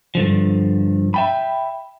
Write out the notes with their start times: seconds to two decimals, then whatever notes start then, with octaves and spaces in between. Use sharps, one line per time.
0.15 G2 D3 F3
1.14 E5 G5 B5